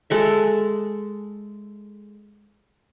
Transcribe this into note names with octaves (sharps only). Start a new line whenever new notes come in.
G#3 A4 E5